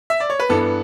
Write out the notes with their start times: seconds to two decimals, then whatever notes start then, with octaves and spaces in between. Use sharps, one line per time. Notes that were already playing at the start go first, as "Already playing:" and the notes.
0.10 E5
0.20 D5
0.30 C#5
0.40 B4
0.49 G2 E3 B3 A4